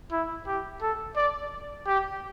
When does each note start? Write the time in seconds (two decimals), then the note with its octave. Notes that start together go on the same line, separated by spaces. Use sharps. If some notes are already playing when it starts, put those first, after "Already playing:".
0.12 E4
0.47 G4
0.82 A4
1.17 D5
1.87 G4